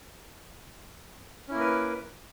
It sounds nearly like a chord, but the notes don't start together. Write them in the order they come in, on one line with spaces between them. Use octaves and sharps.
C#4 E4 A#3 A#4 B4